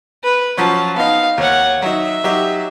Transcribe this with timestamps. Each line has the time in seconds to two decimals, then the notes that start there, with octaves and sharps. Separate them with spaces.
0.23 B4
0.57 F3 F#3 C#4 A5
0.96 B3 D#4 F5
1.38 D#2 C#5 F#5
1.82 F#3 D#4 E5
2.24 F#3 D#4 G4